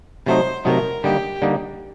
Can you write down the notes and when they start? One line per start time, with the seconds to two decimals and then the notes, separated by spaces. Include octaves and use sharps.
0.26 C3 F#3 A3 D#4 C5
0.65 C3 F#3 A3 D#4 A#4
1.04 D3 G3 A#3 D#4 G4
1.42 D3 G3 A#3 D#4